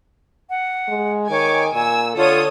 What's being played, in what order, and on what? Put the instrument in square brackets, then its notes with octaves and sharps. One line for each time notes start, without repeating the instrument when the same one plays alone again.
[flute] F#5
[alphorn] G#3
[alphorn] D#3 [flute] C#5 [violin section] G#5 D6
[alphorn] A#2 [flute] G#5 [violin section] E6
[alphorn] D3 [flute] F4 [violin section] A4 C#5 D#6